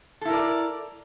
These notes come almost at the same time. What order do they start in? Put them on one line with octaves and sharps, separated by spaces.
A4 E4 A#4 D5